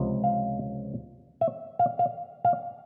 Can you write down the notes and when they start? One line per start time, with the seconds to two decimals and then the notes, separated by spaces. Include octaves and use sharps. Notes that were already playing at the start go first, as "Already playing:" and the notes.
Already playing: C#2 C3 F3
0.24 F5
1.41 E5
1.79 F5
1.99 F5
2.45 F5